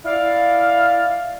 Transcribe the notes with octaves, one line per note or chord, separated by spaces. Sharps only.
E4 D5 F5